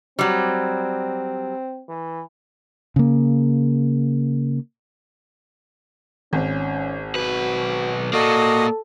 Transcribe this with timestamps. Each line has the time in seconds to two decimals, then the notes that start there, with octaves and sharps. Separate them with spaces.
0.19 F#3 G3 C4
1.89 E3
2.96 C#3 A#3
6.33 G#1 C#4
7.15 B1 F#4 B4
8.13 A#3 F#4 A4 D5 D#5 D#6